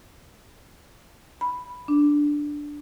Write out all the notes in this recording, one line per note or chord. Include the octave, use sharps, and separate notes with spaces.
B5
D4